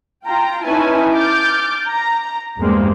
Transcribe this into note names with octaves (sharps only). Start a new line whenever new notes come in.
F4 G5 A#5
C#4 D#4 E4 B4 G#5 A5
D6 F6 G6 A6
A#5
E2 G2 G#3 A#3 C4